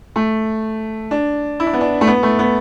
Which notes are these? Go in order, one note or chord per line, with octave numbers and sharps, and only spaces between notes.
A3
D4
E4
D4
B3
D4
A3
B3
A3
B3